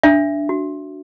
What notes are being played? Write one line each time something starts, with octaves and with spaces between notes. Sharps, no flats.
D4 E5
F#4